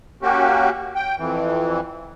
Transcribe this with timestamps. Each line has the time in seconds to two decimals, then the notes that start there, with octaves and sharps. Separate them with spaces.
0.22 A#3 C#4 F#4 G4
0.95 G5
1.18 F2 E3